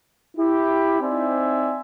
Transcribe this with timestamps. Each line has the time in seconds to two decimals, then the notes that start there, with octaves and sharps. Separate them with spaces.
0.37 E4 G4
1.01 C4 D#4 C5 D5 E5 G#5